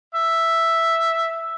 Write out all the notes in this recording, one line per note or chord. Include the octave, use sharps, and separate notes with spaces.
E5